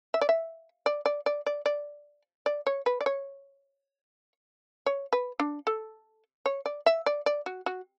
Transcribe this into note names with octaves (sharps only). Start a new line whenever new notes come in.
E5
D5
E5
D5
D5
D5
D5
D5
D5
C#5
B4
D5
C#5
C#5
B4
D4
A4
C#5
D5
E5
D5
D5
F#4
F#4